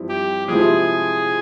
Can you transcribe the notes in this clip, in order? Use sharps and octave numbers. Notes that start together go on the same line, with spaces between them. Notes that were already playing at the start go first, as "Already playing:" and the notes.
Already playing: G2 F3 C4 E4
G4
C3 F3 G#3 C4 E4 G#4